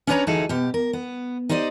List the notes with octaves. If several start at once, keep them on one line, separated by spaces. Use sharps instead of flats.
C#4 D4 F#4 B4 C#5 A#5
D2 E3 F#3 D#4 G#4 A4
B2 G4
A#4
B3
D#4 G4 C5 D5 D#5